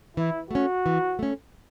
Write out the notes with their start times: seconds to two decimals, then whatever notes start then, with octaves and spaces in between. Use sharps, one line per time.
0.17 E3 E4
0.51 A3 C#4 F#4
0.86 E3
1.19 A3 C#4